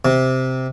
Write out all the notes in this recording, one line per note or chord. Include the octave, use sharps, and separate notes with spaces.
C3